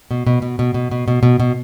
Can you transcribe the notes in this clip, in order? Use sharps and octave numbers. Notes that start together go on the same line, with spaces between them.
B2
B2
B2
B2
B2
B2
B2
B2
B2